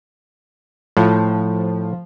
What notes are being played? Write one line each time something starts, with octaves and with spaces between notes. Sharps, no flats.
A2 F3